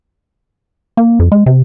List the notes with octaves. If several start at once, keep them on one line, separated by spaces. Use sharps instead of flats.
A#3
F2
G#3
C3